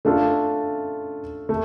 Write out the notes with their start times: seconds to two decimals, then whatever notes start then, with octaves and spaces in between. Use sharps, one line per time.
0.05 A3 D4 F4 A4
1.49 A3